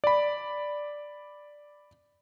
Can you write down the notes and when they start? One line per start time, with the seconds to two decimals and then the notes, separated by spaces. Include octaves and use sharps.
0.04 D5 B5